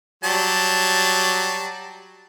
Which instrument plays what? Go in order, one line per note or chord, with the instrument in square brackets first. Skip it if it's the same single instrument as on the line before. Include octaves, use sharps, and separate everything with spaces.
[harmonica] F#3 G3 A5